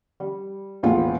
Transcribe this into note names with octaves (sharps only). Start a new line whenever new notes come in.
G3
E1 A#1 A2 B3 F4 G5